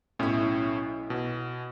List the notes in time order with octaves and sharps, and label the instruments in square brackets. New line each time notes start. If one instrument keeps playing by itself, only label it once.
[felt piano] B1 E4 [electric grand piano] A2 C#4
[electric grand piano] B2